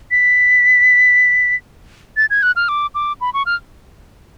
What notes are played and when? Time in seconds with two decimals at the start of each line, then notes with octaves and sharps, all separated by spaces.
0.11 B6
2.17 A6
2.30 G#6
2.43 F#6
2.56 F6
2.69 D6
2.95 D6
3.21 B5
3.34 C#6
3.46 F6